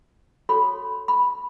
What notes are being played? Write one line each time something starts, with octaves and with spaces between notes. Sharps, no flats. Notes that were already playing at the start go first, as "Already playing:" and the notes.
F#4 A4 C#5 B5
B5